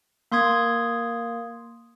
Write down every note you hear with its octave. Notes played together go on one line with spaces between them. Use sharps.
A#3 C6 D#6 G#6